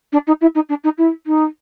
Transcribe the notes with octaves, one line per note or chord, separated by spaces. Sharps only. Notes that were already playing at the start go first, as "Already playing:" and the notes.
D4
D#4
E4
D#4
D4
D#4
E4
D#4